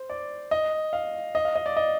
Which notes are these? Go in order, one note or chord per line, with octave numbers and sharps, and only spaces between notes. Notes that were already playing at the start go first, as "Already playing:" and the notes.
Already playing: C5
D5
D#5
F5
D#5
F5
D#5
D5
D#5